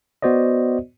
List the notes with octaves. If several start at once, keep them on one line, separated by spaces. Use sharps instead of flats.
B3 F#4 C5 D5 D#5